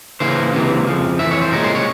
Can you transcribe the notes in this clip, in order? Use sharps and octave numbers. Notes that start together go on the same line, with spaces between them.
C#3 E3 A#3 C#4 C5
C#2 C3 E3 A#3
F2 C#3 F3
F2 C3 E3 E5
C#5
C5
C2 A#2 G#3 C#4 A#4
C5
C#5